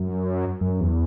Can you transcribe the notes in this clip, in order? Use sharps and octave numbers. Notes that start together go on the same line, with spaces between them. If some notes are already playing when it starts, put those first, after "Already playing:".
Already playing: F#2
F#2
E2